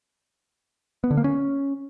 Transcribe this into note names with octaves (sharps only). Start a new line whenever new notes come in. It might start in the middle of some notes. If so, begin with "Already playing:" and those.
B3
D3
A#3
C#4